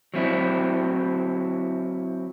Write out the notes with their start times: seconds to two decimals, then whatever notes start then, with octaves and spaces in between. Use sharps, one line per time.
0.14 F#3 C4 E4